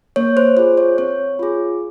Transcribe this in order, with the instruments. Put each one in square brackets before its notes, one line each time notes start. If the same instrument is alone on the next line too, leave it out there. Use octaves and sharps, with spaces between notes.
[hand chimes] A#3 C#5
C5
F4 G#4 C5
C#5
C4 C#5
F4 G#4